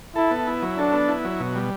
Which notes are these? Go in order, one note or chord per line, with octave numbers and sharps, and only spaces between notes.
E4 A4
B3
E4
F#3
D4 A4
B3
E4
F#3
B2
G3